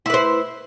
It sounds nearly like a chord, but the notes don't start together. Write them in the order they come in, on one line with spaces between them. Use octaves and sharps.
E4 B4 C5